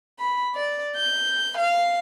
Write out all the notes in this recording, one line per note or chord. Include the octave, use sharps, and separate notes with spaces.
B5
D5
G6
F5